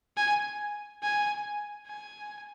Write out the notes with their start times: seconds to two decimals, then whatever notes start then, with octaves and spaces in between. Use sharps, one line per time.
0.17 G#5
1.03 G#5
1.87 G#5